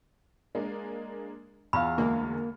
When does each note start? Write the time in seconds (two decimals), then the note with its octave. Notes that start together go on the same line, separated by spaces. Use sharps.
0.55 G#3 A#3 D4
1.73 E2 F5 A#5 B5 C#6 F6
1.98 D2 G#3 A#3